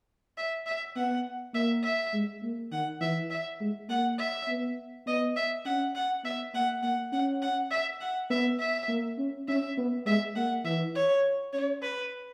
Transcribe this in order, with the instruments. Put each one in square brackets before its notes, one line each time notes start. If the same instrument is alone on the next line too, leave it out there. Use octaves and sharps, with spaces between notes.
[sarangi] E5
E5
[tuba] B3 [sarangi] F#5
[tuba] A#3 [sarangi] E5
[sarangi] E5
[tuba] G#3
A#3
[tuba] D#3 [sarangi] F#5
[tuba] E3 [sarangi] E5
[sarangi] E5
[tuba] G#3
[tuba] A#3 [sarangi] F#5
[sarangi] E5
[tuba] B3
[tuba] B3 [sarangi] D#5
[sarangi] E5
[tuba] C#4 [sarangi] F#5
[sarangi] F#5
[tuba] B3 [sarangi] E5
[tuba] A#3 [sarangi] F#5
[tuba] A#3 [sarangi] F#5
[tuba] C#4 [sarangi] F#5
[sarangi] F#5
E5
F#5
[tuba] B3 [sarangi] E5
[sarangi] E5
[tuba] A#3
C#4
[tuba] C#4 [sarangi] E5
[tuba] B3
[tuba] G#3 [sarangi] E5
[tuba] A#3 [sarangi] F#5
[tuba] E3 [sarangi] E5
[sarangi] C#5
[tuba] C#4 [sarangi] C#5
[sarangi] B4